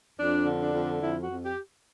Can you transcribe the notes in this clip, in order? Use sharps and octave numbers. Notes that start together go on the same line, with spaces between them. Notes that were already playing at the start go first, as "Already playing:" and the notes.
F2 D4
D3
D4
F2
F2 E4
F#4
F2
G4